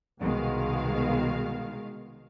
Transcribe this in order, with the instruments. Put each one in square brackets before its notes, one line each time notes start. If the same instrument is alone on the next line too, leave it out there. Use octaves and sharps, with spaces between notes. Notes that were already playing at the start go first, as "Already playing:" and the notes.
[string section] C2 B2 D#3 G#3 F5